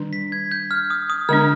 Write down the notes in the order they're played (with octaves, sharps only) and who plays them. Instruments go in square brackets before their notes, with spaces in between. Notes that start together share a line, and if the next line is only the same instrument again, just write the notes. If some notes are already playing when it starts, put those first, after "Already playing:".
Already playing: [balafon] D#3 G3 D4
[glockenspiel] B6
G#6
G6
F6
D#6
D#6
[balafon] D3 G#3 B3 D4 [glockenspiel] F6